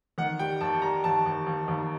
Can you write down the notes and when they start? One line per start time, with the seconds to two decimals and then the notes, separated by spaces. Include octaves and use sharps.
0.18 D#3 F#5
0.39 G3 G5
0.61 D#2 A5
0.82 G3 A#5
1.04 D#2 A5
1.26 D#2
1.47 D#2
1.68 D#2